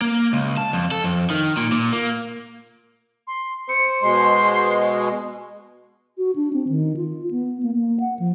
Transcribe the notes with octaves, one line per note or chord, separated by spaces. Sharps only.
A#3
C#2
A5
F2
A4
F2
D#3
A#2
A#2
A#3
C6
C5 C#7
B2 G#3 C6
F#4
D4
C4
D#3
F4
B3
A#3
A#3
F#5
F3